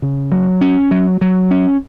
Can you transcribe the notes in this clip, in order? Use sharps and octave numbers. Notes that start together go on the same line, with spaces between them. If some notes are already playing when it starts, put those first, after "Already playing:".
C#3
F#3
C#4
F#3
F#3
C#4